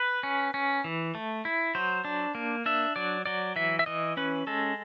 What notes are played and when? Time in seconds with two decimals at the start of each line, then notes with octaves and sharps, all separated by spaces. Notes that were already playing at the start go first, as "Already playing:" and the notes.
Already playing: B4
0.23 C#4
0.54 C#4
0.84 E3
1.15 A3
1.45 E4
1.75 F#3 C5
2.05 D4
2.35 A#3
2.66 D4 E5
2.96 F#3 D5
3.25 F#3 D5
3.56 E3 E5
3.79 E5
3.86 E3 D#5
4.17 C#4 B4
4.47 G#3 A4